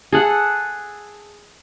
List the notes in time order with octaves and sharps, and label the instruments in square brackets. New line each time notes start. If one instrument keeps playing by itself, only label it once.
[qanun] G#4 A4 F#5